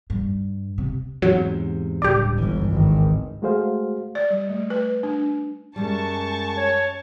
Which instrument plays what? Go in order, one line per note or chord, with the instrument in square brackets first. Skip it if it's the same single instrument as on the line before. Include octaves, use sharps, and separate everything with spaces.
[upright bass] G2
C3
[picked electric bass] E2 G#2 C3 [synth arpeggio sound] F#3
[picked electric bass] D1 C#2 G2 [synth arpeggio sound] G4 D5
[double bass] G1 [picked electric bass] C#2 E3
[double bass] G#1 D#3
[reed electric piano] G#3 A3 F#4 G#4 C5 F5
[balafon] D5
G3
A3
B4
D4
[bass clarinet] F#2 [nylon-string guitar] G3 G#3 [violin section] A5 C#6
[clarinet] C#5